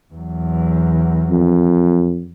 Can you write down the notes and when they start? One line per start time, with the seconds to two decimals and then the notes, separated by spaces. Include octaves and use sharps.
0.14 E2 F#3
1.30 F2